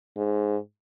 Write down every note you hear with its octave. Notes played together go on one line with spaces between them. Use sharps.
G#2